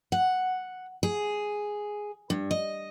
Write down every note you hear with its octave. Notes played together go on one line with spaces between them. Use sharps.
F#5
G#4
G2
D#5